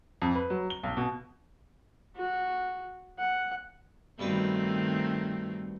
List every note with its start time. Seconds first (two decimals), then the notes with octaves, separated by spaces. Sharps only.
0.22 F2
0.35 B4
0.50 F#3
0.70 G7
0.83 B1
0.97 B2
2.16 F#4
3.18 F#5
4.19 G2 B2 D#3 A3 C4 B4